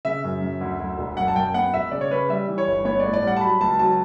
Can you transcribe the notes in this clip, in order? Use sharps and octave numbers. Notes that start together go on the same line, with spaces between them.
C#3 E5
F#2
F#2
D2
D2
E1
F#2 F#5
A5
F#2 G5
B3 F#5
E1 E5
C#3 D5
C#5
C#3 B4
G3 E5
E3
C#5
G1
B3 C#5
A2 D5
D5
G3
F#5
A5
F#3 B5
C#2 A5
F#3 A5